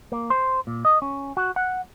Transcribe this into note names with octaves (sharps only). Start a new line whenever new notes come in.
A#3
C5
A#2
D#5
C#4
F#4
F#5